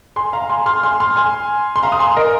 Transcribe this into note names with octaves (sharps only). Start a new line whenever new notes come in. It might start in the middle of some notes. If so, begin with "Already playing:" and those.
G#5 C6
F5 A#5
G#5 C6
C6 F6
G#5 C6
C6 F6
G#5 C6
C6
F5 A#5
D#6
G#5 C6
A#4 D#5